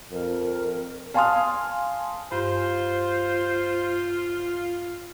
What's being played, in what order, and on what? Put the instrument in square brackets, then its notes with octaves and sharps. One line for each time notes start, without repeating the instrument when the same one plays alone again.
[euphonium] F2 [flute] A#4
[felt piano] F5 G#5 A5 C6 D#6 F6
[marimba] G2 [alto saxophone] F4 [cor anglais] C5